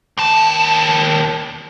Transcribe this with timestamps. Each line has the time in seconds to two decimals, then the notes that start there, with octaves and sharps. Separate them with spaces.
0.18 D#2 A5